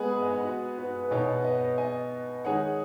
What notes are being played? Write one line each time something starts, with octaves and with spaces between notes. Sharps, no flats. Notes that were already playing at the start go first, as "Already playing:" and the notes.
Already playing: G#3 B3 G#4 F#5 B5
F#5 B5
D#5 G#5
F#5 B5
F#4 B4
F#4 B4
B4
B2 B3 D#4 G#4 C#5
C#5 F#5
B4 D#5
D#5 G#5
D#3 G#3 D#4 G#4 C#5 F#5